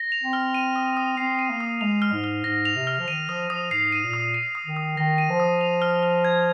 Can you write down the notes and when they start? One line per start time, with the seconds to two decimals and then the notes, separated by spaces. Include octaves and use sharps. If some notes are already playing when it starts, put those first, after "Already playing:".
Already playing: A#6
0.12 F7
0.23 C4
0.33 F6
0.54 D#7
0.76 D#6
0.97 D#6
1.17 C4 C7
1.39 D#7
1.50 A#3
1.60 D#6
1.81 G#3 F7
2.02 F6
2.12 G#2
2.24 F6
2.44 G#2 A#6
2.65 F7
2.75 C3
2.87 F6
2.99 F3
3.08 D#3 D#7
3.29 F3 D#6
3.50 F3 D#6
3.71 G#2 C7
3.92 D#7
4.03 A#2
4.13 D#6
4.34 D#7
4.55 D#6
4.66 D#3
4.77 D#6
4.97 D#3 A#6
5.18 D#7
5.30 F3
5.40 D#6
5.61 F7
5.82 F6
6.03 F6
6.25 G#6